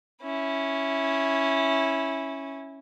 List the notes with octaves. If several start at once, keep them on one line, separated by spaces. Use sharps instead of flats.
C#4 E4